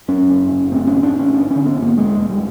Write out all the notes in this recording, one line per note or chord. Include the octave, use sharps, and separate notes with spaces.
F#2 C#4
F#1
F#1
A2 C4
C#4
A1
D4
A1
C#4
G1 D4
C#4
D3
B3
G1
A#3
E1 G#3
E1
G3